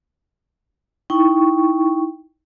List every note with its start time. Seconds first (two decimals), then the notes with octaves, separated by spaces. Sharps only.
1.10 D#4 E4 G5 C#6